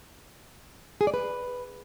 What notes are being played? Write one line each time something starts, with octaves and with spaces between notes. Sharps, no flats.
G#4
D5
B4